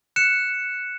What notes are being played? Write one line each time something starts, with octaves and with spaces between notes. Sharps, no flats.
F#6 C#7 E7